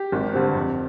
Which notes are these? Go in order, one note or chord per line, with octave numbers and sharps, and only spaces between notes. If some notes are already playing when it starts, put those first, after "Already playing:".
Already playing: G4
G#1
G2 D3 G3 C4
F2